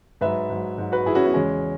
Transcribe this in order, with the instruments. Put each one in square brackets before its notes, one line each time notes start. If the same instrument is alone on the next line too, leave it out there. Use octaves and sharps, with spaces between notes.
[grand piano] G#2 F#3 B4 E5
G#2 F#3
G#2 F#3
F#4 B4
G#2 F#3 E4 G#4
C#4 F#4
B3 E4
E2 C#3 E3 G#3 C#4